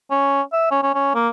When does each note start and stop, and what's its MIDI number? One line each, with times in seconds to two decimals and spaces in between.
0.11 0.42 61
0.53 0.67 76
0.71 0.79 61
0.83 0.93 61
0.94 1.11 61
1.15 1.29 58